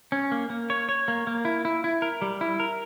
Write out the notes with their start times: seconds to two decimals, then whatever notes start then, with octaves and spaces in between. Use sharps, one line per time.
0.12 C#4
0.32 A#3
0.50 A#3
0.70 C#5
0.89 C#5
1.08 A#3
1.27 A#3
1.45 E4
1.65 E4
1.84 E4
2.02 A#4
2.22 G3
2.41 E4
2.60 A#4